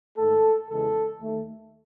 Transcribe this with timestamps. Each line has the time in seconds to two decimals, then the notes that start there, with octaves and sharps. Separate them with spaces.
0.17 G#2 D#3 A3 A4
0.69 E2 C#3 E3 G#3 A4
1.19 D#2 D#3 A3